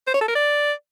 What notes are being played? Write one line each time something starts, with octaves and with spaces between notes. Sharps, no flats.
C5
C#5
A4
A#4
D5